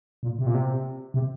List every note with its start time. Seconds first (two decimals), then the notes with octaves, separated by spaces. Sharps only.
0.23 A#2
0.39 C3
0.47 A#2
0.54 C3
1.14 C3